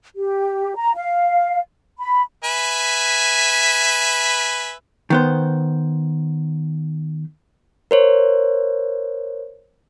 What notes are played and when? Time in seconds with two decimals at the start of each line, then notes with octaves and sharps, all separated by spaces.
0.15 G4
0.76 A#5
0.96 F5
1.99 B5
2.44 B4 E5 G#5
5.10 D#3 B3 C5
7.91 A#4 C5 C#5